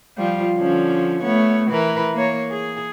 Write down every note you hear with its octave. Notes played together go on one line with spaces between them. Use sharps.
F3 G3 F4
D3 F3 C#4
A3 B3 C#5
E3 A#4 B4
A#3 C#5
G#4